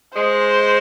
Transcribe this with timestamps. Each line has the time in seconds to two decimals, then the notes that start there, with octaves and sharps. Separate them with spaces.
0.16 G#3 C5